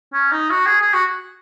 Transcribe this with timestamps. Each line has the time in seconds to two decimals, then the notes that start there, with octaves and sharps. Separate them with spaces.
0.13 C#4
0.32 D#4
0.50 F#4
0.66 G#4
0.81 G#4
0.93 F#4